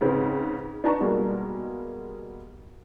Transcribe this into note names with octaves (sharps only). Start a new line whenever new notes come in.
G#2 C#3 C4 B4
D4 D#4 B4 A5 A#5 C#6
B2 G3 G#3 A#3